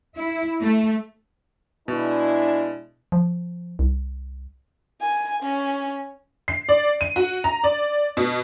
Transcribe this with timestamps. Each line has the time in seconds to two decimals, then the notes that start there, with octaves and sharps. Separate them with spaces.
0.16 E4
0.61 A3
1.88 B2 G#3 D4 E4
3.12 F3
3.79 C2
5.01 G#5
5.43 C#4
6.48 C7
6.69 D5
7.01 D#7
7.16 F#4
7.44 A#5
7.64 D5
8.17 B2